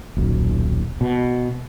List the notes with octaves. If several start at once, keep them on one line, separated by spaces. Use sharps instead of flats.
D#1 B1
B2